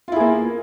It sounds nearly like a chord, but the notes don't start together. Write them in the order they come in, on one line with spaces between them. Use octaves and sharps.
F4 E4 G#4 A#3